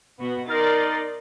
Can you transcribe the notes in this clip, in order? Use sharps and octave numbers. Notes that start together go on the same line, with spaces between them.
B2 B3 F#4
D#4 A#4 D5 C6 A6